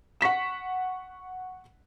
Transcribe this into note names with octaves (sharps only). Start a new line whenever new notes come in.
F#5 C#6 B6 E7